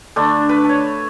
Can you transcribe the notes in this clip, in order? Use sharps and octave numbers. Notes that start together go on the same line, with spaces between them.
D3 A3 D4
B4
A4 C#5